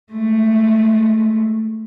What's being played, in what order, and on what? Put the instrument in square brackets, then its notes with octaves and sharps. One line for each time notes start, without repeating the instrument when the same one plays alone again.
[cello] G#3 A3